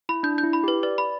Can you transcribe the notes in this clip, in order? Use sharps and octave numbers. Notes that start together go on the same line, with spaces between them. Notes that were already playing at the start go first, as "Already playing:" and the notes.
E4 B5
D4 G6
G6
E4
B5
G4 B4
B4 D5
B5